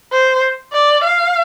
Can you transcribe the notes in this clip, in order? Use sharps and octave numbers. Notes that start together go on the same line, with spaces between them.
C5
D5
F5